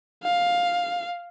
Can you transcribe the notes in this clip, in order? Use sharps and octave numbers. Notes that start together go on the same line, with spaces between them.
F5